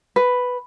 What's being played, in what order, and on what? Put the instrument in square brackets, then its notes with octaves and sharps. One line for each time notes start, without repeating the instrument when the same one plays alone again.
[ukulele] B4